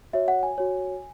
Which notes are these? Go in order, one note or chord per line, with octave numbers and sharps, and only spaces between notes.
F#4 C#5 E5
F#5
G#5
F#4 C#5